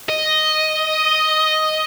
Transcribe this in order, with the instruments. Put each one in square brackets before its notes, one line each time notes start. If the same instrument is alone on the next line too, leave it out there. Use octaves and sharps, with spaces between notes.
[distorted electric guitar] D#5